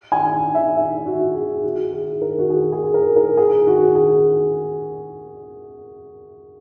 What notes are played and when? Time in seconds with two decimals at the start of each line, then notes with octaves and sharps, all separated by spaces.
0.12 G#5
0.55 E5
0.77 E5
1.06 F#4
1.35 G#4
1.64 F#4
1.93 G#4
2.22 A#4
2.38 F#4
2.50 G#4
2.72 G#4
2.94 A#4
3.16 A#4
3.37 G#4
3.67 F#4
3.95 G#4